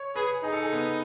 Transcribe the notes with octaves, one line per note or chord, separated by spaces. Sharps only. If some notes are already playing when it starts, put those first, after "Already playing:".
Already playing: C#5
G#4 B4
D#4 G#4
A4
G#4
B3